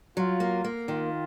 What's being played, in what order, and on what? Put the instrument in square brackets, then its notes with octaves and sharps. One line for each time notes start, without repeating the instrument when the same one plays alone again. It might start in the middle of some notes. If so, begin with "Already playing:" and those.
[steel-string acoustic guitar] F#3 [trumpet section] F4
[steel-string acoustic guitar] A#3
A#3
[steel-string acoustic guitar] D#3 [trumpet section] F4